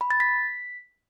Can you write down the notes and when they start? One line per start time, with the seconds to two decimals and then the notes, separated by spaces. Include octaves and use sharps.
0.01 B5
0.11 A6
0.20 B6